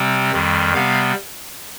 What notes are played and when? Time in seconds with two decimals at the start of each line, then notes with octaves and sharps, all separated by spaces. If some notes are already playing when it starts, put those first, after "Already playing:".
Already playing: C3 G3 C4
0.32 F2 D#3 G3
0.74 C3 G3 B3 F5